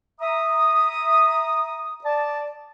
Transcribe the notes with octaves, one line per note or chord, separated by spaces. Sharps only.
E5 A#5 D#6
D5 A5